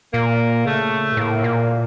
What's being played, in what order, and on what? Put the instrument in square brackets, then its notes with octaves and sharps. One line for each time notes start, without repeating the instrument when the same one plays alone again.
[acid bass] A#2 [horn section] A#3
[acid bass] C#3 [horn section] A3
[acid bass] A#2
[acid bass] A2 [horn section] A#3
[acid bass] A#2